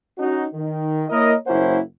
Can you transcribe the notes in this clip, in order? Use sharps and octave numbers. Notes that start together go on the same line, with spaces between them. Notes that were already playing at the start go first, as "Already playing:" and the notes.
C#4 D#4 F#4
D#3
A#3 E4 A#4 C#5 D#5
F#1 A#3 C#4 E4 C5 F#5